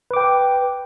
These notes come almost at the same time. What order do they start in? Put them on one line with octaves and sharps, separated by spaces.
B4 D6 G5